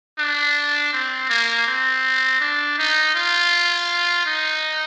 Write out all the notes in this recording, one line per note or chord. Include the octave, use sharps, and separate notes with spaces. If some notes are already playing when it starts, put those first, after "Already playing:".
D4
C4
A#3
C4
D4
D#4
F4
D#4